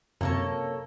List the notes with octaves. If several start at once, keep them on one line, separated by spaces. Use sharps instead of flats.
F#2 C3 A#3 A4 C#5